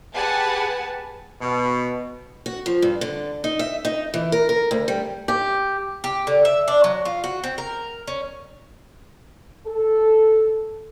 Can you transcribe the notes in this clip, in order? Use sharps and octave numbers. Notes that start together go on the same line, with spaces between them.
G4 G#4 B4 F#5 G#5 A5
B2
F#4
F3
G2
D3
D#4
E5
D#4
E3
A#4
A#4
D2
G3
G4
G4
D3
E5
D4
F#3
F4
F#4
C4
A#4
C#4
A4